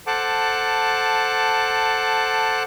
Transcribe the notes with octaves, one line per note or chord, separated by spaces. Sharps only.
A4 C5 F#5 A5 D6